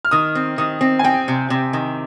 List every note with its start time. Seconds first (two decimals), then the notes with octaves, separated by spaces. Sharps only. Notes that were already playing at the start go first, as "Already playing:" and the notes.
0.05 F6
0.11 D#3 D#6
0.35 C4
0.58 D#3 D#6
0.81 C4
0.99 G#5
1.04 C4 G5
1.28 C3
1.50 C3
1.73 D#3